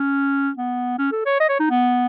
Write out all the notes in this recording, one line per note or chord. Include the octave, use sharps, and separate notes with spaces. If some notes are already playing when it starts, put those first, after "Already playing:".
Already playing: C#4
B3
C#4
A4
C#5
D#5
C#5
D#4
B3